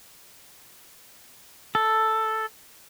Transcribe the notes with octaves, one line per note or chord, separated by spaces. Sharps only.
A4